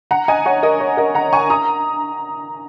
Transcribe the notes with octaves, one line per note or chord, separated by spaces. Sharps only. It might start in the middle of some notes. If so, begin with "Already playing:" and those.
F#5 A#5
D#5 G#5
C#5 F#5
A#4 D#5
C#5
A#4 D#5
F#5 A#5
G#5 C#6
A#5 D#6